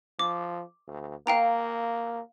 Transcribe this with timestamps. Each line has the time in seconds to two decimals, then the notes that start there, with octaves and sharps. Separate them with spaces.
0.19 F3 D6
0.88 D2
1.27 A#3 F5 G5 A#5